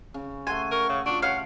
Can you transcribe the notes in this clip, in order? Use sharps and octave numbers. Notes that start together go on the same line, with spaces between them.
C#3
A3 F#5 G#5 C6
A#4 C#6
C#3
D4 F4 F#4 C#6
C#4 F5 F#5